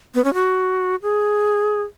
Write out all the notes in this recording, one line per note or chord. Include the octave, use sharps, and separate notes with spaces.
B3
C#4
F#4
G#4